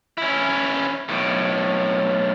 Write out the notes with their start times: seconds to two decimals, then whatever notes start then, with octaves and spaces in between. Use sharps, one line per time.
0.18 C#4 E4
1.09 B1 A2